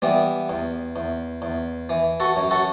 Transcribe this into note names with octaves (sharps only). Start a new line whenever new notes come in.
E3 G3 B3
E2
E2
E2
E3
F#4 A4
F#2
F#4 A4